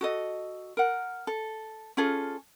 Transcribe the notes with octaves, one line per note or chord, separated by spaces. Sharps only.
F#4 A4 D#5
A#4 F#5
A4
C#4 F4 G#4 A4